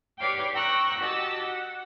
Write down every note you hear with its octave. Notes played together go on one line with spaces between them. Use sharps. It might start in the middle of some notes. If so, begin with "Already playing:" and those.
G4 B4 C#5 D5 F5 G5
G5 A#5 C#6 E6 F#6
F#4 G4 D#5 A5 E6
F#5